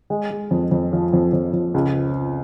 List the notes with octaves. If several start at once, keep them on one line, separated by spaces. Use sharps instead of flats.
G#3
G#3
F2
F2
F3
F2
F2
F2
C#2